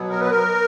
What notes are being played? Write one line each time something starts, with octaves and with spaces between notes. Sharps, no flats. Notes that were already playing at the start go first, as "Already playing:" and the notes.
Already playing: B2 F#3 B3
A#4
B4
A#4